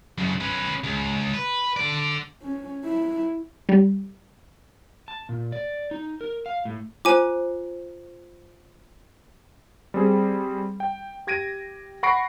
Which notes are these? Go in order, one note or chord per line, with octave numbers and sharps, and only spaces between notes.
F#2 C#3
C#4 B4
C#2
B4
D3 D5
C#4
E4
G3
A5
A#2
D5
D#4
A#4
F5
A2
F4 C5 G#5 D6
G3 C4 G#4
G5
G4 G#6 A#6 D7 D#7
F#5 B5 C#6 A#6 C7 D7